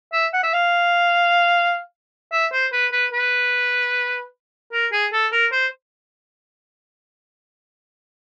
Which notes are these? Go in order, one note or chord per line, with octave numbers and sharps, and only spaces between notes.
E5
F#5
E5
F5
E5
C5
B4
B4
B4
A#4
G#4
A4
A#4
C5